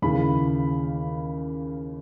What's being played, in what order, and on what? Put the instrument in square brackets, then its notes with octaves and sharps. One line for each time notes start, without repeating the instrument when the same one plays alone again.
[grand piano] D#2 C#3 E3 B5